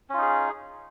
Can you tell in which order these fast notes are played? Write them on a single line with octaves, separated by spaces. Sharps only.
C#4 F4 D#4 G#4